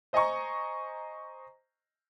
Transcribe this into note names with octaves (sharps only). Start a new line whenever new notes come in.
C5 D#5 G#5 A#5 C#6